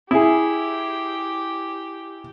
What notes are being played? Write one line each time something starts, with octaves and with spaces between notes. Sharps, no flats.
E4 G4 G#4